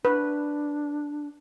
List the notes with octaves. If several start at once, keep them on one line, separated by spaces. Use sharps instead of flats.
D4 B4